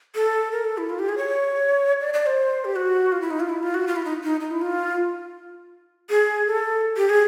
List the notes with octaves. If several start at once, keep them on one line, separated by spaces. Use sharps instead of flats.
A4
A#4
A4
E4
F4
G4
G#4
C#5
D5
D5
C5
G4
F#4
F4
E4
D#4
F4
E4
F4
F#4
F4
E4
D#4
D#4
D#4
E4
F4
G#4
A4
G4
G#4